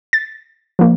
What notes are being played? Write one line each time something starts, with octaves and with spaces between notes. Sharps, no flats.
A6
F3 A#3